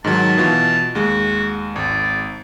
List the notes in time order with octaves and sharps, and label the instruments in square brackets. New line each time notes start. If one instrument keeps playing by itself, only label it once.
[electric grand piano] G#2 D#3 F#3 [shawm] A5
[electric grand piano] B2 E3 F4
[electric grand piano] D#2 G#3 [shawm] F#4
[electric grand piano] G#1 [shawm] D5